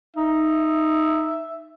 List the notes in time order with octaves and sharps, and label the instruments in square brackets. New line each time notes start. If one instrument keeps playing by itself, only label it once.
[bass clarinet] D#4 [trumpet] E5